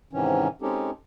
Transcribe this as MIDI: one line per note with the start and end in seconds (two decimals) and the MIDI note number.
0.13 0.48 44
0.13 0.48 48
0.13 0.48 51
0.13 0.48 52
0.13 0.48 61
0.62 0.91 56
0.62 0.91 60
0.62 0.91 61
0.62 0.91 63
0.62 0.91 67
0.62 0.91 69